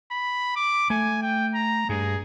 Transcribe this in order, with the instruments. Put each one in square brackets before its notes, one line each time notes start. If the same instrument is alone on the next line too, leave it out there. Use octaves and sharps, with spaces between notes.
[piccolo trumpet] B5
D6
[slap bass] A3 [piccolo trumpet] G#5
[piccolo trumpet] G5
A#5
[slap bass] G2 [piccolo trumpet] G#4